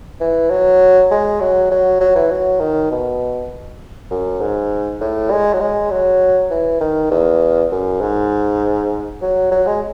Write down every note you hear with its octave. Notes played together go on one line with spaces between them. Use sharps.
E3
F#3
G#3
F#3
F#3
F#3
E3
F#3
D#3
B2
F#2
G#2
A2
G#3
F#3
G#3
F#3
E3
D#3
E2
F#2
G#2
F#3
F#3
G#3